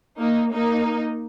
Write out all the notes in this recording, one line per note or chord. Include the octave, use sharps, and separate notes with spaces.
A#3 D#4
A#3 D#4